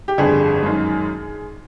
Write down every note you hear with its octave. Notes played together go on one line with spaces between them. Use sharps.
G4
G1 F2 D3 G3 G#4
F#2 D#3 G#3